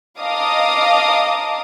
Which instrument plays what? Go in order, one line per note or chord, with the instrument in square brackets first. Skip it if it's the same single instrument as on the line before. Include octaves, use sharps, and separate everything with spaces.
[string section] D#5 F5 A5 A#5 D6 D#6